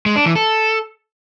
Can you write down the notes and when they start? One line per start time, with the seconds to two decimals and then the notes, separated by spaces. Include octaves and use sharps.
0.06 G#3
0.16 D4
0.26 E3
0.35 A4